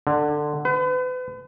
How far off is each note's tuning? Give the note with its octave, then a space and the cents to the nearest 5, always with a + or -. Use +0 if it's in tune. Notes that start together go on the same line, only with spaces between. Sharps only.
D3 +15
B4 +40